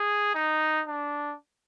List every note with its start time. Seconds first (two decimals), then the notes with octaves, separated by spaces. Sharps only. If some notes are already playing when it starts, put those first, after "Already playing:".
Already playing: G#4
0.35 D#4
0.88 D4